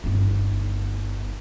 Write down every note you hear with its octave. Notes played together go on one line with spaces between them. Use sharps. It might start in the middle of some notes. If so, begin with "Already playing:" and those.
G1 D#4